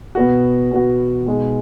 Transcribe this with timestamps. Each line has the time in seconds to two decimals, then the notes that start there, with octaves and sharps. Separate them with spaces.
0.15 B2 B3 F#4
0.71 B2 B3 F#4
1.26 B2 G#3 D#4